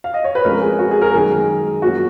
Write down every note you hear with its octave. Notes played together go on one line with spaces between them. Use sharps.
F5
D#5
C#5
B4
F2 F3 G#3 C#4 A#4
G#4
F#4
G#4
A#4
F#2 D#3 G#3 G#4
F#2 F3 A#3 C#4 F#4